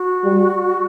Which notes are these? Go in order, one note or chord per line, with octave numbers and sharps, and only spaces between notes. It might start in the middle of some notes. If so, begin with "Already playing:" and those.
Already playing: F#4
G3